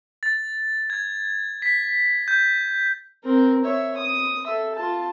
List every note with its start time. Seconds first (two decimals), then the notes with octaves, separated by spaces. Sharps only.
0.23 A6
0.90 G#6
1.62 B6
2.28 G6
3.24 C4 A#4
3.65 C#5 E5
3.97 D#6
4.47 A4 E5
4.75 F4 A5